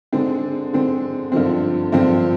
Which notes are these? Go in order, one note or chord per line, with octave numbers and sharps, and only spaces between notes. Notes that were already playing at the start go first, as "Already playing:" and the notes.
D3 G#3 C4
D3 G#3 C4
G2 D3 F3 C4
G2 D3 F3 C4